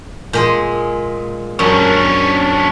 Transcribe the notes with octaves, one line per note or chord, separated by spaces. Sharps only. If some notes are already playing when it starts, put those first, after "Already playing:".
A#2 G#3 G#4
F#2 C#4 D4